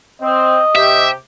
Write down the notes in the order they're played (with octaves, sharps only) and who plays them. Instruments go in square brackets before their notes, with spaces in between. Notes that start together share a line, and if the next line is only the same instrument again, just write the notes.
[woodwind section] C4 [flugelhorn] D#5
[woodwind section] C3 G4 [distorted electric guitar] E5